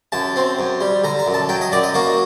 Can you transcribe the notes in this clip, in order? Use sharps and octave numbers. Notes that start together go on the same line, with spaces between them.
F#2 A5
C4
F#2
G3
D3 A#5
A#5
F#2
A5
F#3 G5
D#5
F#2 D5
D#5
A#3 F#4